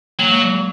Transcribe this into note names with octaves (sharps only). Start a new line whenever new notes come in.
F#3 A#3
G#3
F#3
F#3